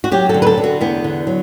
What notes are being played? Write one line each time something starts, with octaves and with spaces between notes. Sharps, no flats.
F#4
F#3 G4
D3 A4
B4
A4
D3
F#4
E2 B3
D3
F#3